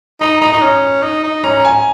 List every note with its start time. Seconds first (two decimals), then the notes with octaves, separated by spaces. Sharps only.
0.21 D#4 A#5
0.41 D#4 A#5
0.53 D#4
0.62 C#4
1.02 D#4
1.23 D#4
1.44 C#4 A#5
1.65 G#5